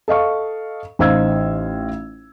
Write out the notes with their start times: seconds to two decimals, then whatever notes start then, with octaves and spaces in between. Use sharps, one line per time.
0.08 A4 D#5 F5 C#6
0.99 A1 D#4 C5 F5 E6 G#6